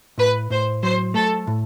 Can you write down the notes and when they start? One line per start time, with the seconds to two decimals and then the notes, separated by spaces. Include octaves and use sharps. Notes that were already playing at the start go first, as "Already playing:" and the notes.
0.18 A2 B4
0.50 A2 C5
0.83 F#3 C5
1.14 A3 A4
1.47 A2